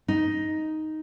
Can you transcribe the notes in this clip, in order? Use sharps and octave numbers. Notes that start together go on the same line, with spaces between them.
D#4